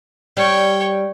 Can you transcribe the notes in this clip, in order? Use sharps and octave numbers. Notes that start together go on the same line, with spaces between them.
G3 C#5 G5